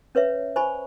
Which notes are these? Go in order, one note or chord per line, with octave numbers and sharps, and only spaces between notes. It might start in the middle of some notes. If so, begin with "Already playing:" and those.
C#4 B4 C#5 E5
C5 G#5 B5 C#6